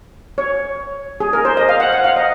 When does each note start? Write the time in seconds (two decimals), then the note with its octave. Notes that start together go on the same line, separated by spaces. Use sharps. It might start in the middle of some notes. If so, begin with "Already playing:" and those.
0.38 C#5
1.20 G#4
1.33 A#4
1.45 C5
1.57 D#5
1.69 F5
1.80 F#5
1.92 F#5
2.04 F5
2.16 D#5